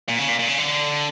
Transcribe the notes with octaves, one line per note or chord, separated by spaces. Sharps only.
A#2
C#3
A#2
A#2
C#3
D3